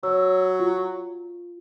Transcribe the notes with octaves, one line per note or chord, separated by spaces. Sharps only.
F#3 C#5 E6
F4